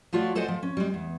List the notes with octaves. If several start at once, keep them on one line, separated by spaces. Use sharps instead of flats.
F3 A3 F4 F#4 C#5 D5
A4 C5 D5 D#5 F#5 G#5
F3
C#4
G3 G#3
E2